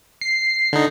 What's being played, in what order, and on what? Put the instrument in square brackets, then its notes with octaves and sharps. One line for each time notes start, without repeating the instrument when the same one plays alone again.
[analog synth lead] C7
[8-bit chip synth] D3 D#4